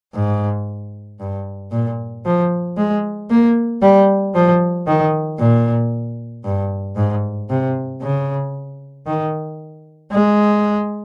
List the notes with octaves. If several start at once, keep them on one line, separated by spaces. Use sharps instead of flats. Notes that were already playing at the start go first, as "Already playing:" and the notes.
G#2
G2
A#2
F3
G#3
A#3
G3
F3
D#3
A#2
G2
G#2
C3
C#3
D#3
G#3